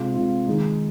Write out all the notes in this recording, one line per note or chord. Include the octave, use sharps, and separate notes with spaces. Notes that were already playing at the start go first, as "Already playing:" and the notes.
Already playing: C3 G#3 F4
C3 G#3 F4
D#3 G#3 D#4